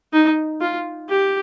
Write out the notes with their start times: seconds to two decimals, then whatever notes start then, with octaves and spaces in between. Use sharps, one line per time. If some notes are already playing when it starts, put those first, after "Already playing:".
0.13 D#4
0.61 F4
1.09 G4